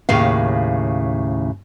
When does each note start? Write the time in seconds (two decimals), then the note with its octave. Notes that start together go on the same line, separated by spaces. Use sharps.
0.09 D#2 A2 C#3 F5